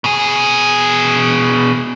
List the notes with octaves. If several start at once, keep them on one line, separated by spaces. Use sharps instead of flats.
B2 G#4